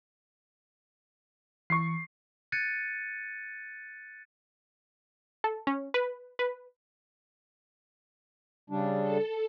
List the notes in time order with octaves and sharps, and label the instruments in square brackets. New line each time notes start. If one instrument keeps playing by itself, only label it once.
[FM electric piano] E3 [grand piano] C#6 C7
[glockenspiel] F#6 G#6 A6 C#7 D#7
[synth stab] A4
C#4
B4
B4
[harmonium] C#3 G3 D4
[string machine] A4